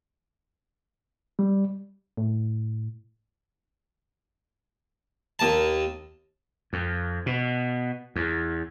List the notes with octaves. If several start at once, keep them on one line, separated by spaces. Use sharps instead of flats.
G3
A2
D#2 A5
F2
B2
E2